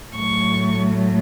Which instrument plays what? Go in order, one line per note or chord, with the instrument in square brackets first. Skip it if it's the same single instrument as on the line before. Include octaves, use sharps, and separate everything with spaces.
[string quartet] A2 F#3 A3 C#6